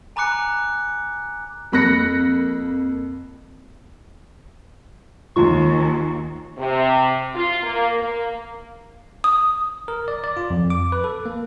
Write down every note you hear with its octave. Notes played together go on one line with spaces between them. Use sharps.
G#5 A#5 B5 D6 F#6 C#7
F2 A#3 B5 F#6 A#6 C#7
D#2 F4 C#6
C3
F4
A#3
A#3
D#6
A#4
D5
D5
F4
F2
D6
B4
A4
A#3